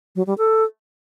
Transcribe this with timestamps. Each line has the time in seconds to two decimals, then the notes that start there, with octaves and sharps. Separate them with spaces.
0.16 F#3
0.27 G3
0.38 A4